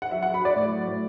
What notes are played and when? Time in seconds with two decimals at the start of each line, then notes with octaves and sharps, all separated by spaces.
0.02 F#5
0.11 F#3 E5
0.23 F#3 F#5
0.34 B5
0.42 F#3 D5
0.56 A2
0.72 F#3
0.87 A2